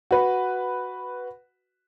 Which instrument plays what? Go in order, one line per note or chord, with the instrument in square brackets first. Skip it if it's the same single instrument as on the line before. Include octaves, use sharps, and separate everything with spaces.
[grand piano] F#4 B4